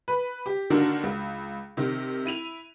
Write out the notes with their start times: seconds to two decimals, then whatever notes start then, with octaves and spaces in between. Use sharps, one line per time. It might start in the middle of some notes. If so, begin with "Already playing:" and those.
0.08 B4
0.46 G4
0.70 D3 D#3 A#3 D4 F#4 A#4
1.03 C#2
1.77 C3 D#3 C4
2.25 E4 D#7 F7